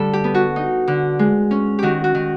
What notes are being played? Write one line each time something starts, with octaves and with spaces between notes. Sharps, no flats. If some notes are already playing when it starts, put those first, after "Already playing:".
Already playing: D3 G3 A4
G4
B3
F#4
D#4
D3
G#3
C#4
D#3 F#4 G4
F#4
D#3